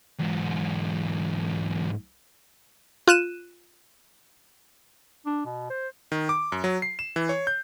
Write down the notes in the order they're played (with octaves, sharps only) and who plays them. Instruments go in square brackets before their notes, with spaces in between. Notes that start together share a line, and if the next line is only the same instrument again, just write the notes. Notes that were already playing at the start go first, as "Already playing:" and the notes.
[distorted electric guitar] E2 G#2
[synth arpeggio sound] F4 F#6 D#7 E7
[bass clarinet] D4
B2
C5
[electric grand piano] D#3
D6
F#2
F#3
C7
E7
E3
C#5
G6